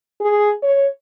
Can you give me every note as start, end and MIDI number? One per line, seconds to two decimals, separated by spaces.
0.21 0.52 68
0.63 0.87 73